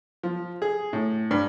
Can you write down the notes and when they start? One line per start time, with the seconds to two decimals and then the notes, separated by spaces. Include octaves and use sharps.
0.23 F3
0.62 G#4
0.93 A2
1.31 G2